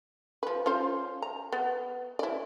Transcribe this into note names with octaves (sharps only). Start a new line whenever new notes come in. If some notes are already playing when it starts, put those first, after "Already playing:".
F3 B4
C#4 F4 C5
A#5
B3
E4 D5